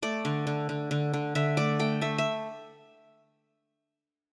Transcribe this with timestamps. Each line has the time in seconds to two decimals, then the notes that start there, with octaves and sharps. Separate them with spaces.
0.02 A3 D5
0.25 D3
0.47 D3
0.69 D3
0.91 D3
1.14 D3
1.35 D3 E5
1.57 A3 D5
1.79 A3 G5
2.01 A3 E5
2.18 E5